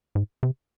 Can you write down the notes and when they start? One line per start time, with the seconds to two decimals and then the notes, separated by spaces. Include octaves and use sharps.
0.15 G#2
0.43 C3